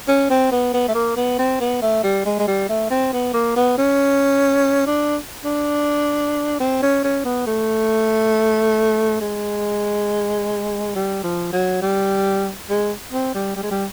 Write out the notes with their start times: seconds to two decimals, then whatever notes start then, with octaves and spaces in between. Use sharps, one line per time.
0.08 C#4
0.30 C4
0.52 B3
0.73 B3
0.88 A3
0.95 A#3
1.16 B3
1.39 C4
1.60 B3
1.82 A3
2.03 G3
2.25 G#3
2.39 G#3
2.47 G3
2.69 A3
2.90 C4
3.13 B3
3.34 A#3
3.56 B3
3.78 C#4
4.86 D4
5.44 D4
6.60 C4
6.82 C#4
7.04 C#4
7.25 B3
7.47 A3
9.21 G#3
10.95 G3
11.24 F3
11.53 F#3
11.82 G3
12.70 G#3
13.12 C4
13.34 G3
13.56 G3
13.63 G#3
13.71 G3